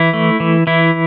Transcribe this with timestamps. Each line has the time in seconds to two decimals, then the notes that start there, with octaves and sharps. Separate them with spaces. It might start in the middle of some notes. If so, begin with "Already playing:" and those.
Already playing: E3 E4
0.14 A3
0.40 E3
0.67 E3 E4